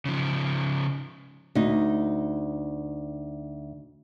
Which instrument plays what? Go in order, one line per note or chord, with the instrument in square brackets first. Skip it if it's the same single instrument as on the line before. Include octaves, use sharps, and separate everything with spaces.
[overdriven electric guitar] C#3 F3
[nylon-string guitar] D2 D#4